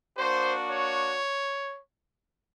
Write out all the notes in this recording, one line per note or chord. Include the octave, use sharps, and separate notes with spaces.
A#3 D4 F#4 C5
C#5